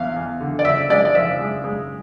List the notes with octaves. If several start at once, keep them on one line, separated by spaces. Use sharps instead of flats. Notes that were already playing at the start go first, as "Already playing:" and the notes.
Already playing: E2 F5
E2
D3
D5
D3 E5
G#3 D5
D5
F3 E5
G#3
G#3